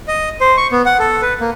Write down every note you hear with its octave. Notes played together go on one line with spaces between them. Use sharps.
D#5
C5
C#6
B3
F#5
A4
B4
A#3